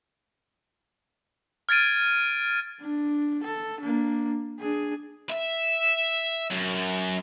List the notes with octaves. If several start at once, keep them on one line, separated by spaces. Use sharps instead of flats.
F6 G#6 A6 D7 D#7
D4
A4
A#3 D4
D4 G#4
E5
F#2